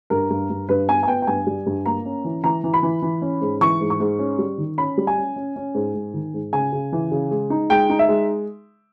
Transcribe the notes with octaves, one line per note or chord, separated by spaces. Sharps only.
G2 A#4
G2
G2
G2 B4
B3 G#5
G#5
B3 G5
G5
G2 G#5
G3
G2
A#3 A#5
C#4
E3
E3 A#5
E3
B5
E3
E3
C#4
G#2
E3 C#6
G#2
C#6
G#2
C#4
G3
D#3
C#4 B5
G3
G#5
C#4
C#4
C#4
G#2
G#2
D#3
G#2
C#3 G#5
C#3
E3
C#3
G#3
D#4
G#3 G5
D#4
E5
G#3